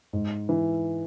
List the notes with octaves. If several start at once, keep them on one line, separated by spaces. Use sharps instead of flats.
G#2
E3